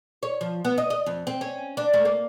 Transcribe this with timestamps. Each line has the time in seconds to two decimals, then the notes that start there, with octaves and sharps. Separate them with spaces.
0.23 C#5
0.41 F3
0.65 B3
0.78 D#5
0.90 D#5
1.06 F2
1.27 C4
1.41 C#4
1.77 D4
1.94 A3
2.05 A#3